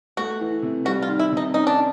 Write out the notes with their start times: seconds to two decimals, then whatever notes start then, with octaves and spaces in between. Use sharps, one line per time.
0.17 A3 F#4
0.41 E3
0.62 C3
0.85 G3 F#4
1.02 F4
1.08 D#3
1.19 E4
1.32 C3
1.37 D#4
1.54 C#4 D#4
1.67 D4